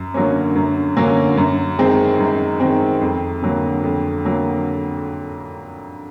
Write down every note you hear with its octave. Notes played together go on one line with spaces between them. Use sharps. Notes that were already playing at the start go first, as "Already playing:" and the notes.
Already playing: F#2
D3 F#3 A#3 C#4
F#2
D3 F#3 A#3 C#4
F#2
D#3 G#3 C4
F#2
D#3 G#3 C4
F2
D3 F#3 A#3
F2
D3 F#3 A#3